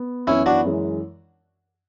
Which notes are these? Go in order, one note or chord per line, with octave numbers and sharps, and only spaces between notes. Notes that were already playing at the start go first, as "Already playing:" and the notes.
Already playing: B3
F#2 E3 B3 C#4 E4
D4 F#4
F#2 E3 G#3